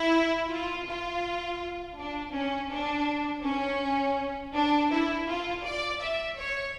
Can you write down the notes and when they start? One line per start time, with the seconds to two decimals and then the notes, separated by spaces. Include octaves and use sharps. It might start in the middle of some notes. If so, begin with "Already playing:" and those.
Already playing: E4
0.50 F4
0.87 F4
1.98 D4
2.33 C#4
2.70 D4
3.44 C#4
4.54 D4
4.91 E4
5.27 F4
5.64 D5
6.01 E5
6.37 C#5